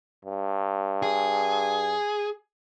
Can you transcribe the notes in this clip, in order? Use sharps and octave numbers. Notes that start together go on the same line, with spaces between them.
G2
G#4